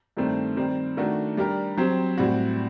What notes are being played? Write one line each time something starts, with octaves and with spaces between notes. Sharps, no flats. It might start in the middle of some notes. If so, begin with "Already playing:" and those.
G2 D#3 A3 C4
D#3 G3 C4
D#3 A3 D4 F#4
G3 D4 G4 A#4
F#3 C4 G4 C5
A2 G3 C4 F#4